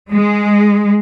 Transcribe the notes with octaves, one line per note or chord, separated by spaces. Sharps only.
G#3